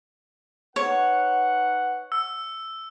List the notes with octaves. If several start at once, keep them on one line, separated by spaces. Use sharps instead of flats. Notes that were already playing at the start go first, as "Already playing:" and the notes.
D#4 B4 C#5 F#5
E6